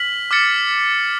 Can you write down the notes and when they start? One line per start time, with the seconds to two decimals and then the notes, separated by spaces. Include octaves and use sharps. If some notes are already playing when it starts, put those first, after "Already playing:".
Already playing: F6 B6 F#7
0.31 D6 F6 A6 C#7